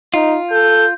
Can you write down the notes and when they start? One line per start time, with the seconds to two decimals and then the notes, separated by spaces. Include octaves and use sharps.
0.14 D#4 F4
0.51 A4 G6